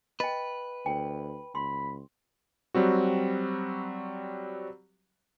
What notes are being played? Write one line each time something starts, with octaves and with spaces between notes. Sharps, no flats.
B4 D#5 G5
D2 G5
C#2 B5 C6
F#3 G3 C4 F#4